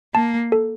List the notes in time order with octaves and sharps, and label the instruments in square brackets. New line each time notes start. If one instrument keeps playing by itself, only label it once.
[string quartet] A#3 [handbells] A5
[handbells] A4